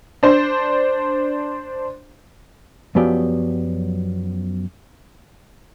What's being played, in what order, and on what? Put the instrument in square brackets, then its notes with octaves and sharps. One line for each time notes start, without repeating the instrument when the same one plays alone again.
[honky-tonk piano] D4 C5
[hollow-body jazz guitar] F#2 F3 F#3 B3 G4 D5